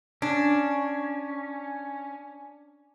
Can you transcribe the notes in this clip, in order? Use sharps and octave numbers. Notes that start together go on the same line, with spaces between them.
C#4 D4